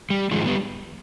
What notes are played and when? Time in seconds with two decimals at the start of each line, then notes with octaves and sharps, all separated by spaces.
0.10 G3
0.31 G#2 D#3 F3 G#3
0.45 G3 B3